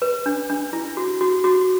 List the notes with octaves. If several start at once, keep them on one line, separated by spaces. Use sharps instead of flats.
B4
D4
D4
E4
F#4
F#4
F#4